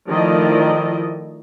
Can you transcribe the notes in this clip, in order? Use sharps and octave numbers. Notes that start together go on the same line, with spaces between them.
D#3 F3 A3 E4 D5 D#5